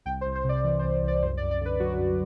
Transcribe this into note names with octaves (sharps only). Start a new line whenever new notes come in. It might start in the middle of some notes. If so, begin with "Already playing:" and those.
C2 G5
C5
C2
C5
C3 D5
E3
C5
C2
C2
D5
F#2 C5
D5
F#2
D5
D3 B4
F#3 F#4
F#2